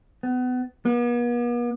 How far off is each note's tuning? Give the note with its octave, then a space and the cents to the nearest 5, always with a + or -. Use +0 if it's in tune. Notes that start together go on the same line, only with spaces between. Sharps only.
B3 +30
B3 -45